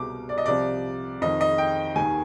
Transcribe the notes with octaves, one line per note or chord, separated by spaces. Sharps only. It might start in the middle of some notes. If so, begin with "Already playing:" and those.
Already playing: C2 B2 D6
D5
D#5
C2 C3 F3 D5
F2 D#3 D#5
D#5
G5
D#2 D#3 G#5